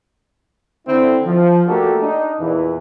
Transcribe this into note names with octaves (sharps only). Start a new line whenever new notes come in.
D3 C4 E4
F3
A3 A#3 D4 F#4 G4 A4
D4 D#4
E2 A#2 E3